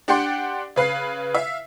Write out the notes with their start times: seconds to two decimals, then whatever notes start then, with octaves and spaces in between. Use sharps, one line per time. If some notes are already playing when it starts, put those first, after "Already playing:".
0.08 D4 G4 D5 F#5 G5 C6
0.76 C#3 B4 F5 C7
1.34 E5 F5